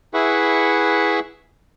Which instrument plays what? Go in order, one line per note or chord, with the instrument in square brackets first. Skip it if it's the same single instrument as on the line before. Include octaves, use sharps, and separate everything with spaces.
[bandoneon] E4 G#4 B4 E5 F#5 C#6